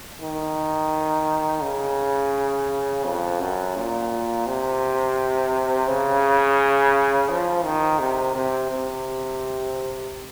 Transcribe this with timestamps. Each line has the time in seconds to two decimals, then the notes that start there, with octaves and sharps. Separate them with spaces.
0.22 D#3
1.63 C#3
3.05 F2
3.40 F#2
3.76 A#2
4.47 C3
5.88 C#3
7.30 F3
7.64 D#3
7.99 C3
8.35 C3
8.71 C3